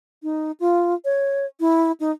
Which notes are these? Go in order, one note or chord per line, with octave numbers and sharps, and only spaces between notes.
D#4
F4
C#5
E4
D#4